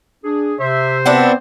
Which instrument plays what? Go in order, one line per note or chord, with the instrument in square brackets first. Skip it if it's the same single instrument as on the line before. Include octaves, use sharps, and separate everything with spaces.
[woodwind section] D4 G#4
[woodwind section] C3 [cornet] C5 [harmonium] E5
[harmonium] B3 C4 [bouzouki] D4 E4 F#4